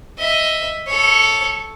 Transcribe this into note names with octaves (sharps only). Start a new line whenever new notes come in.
D#5 E5
A4 C#5